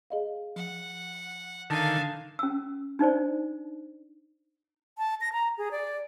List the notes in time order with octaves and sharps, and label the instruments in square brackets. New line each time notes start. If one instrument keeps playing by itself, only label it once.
[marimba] G#4 D#5 F5
[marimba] F3 [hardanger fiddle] F#5
[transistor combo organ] D3 D#3 [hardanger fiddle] F5 G#5 [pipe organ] A5
[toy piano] C#4 E6
D4 D#4 C5 D5
[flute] A5
A#6
A#5
G#4
D5